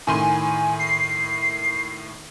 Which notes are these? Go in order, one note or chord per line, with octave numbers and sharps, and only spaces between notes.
A2 D#3 G#5 C6
C7